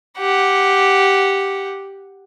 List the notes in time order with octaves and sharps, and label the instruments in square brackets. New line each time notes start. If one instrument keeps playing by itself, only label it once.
[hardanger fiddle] G4 F#5